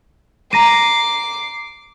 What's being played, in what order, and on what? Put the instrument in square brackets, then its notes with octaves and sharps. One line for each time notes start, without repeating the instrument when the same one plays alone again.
[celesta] A#5 A#6 D#7 [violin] D6 C7